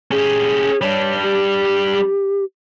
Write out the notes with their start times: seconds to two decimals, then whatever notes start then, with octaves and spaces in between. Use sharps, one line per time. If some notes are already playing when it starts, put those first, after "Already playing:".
0.11 C#4 G4 G#4
0.81 G3 D4 C#5
1.22 G4